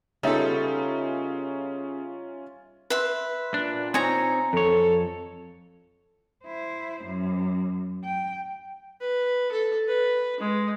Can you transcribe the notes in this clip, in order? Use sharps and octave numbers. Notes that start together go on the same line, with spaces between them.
C#3 G3 B3 C#4 D#4 F4 A4 E5
B4 E5 C6
A#2 D4
C4 D#4 C#5 G#5 A#5
F2 A4 C#5
E4 C5
F#2
G5
B4
A4
B4
G#3